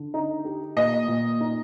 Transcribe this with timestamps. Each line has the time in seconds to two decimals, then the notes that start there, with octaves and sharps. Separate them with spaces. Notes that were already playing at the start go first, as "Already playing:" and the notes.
Already playing: D3
0.14 D#4
0.45 G4
0.76 A#2 D#5
1.08 A#2
1.40 D#4